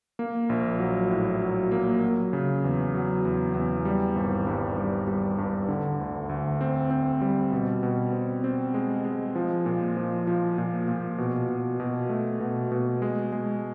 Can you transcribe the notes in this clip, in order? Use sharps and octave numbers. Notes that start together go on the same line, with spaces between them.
A#3
A#1
F#3
A2
F#3
A#3
F#3
C#3
E2
F#3
E2
E2
G3
G#1
G2
G3
G3
G2
D3
D2
D2
C4
C4
G3
B2
B2
C4
C4
G#3
G#3
F3
A#2
F3
F3
A#2
A#2
B2
B2
B2
A3
B2
B2
G#3
G#3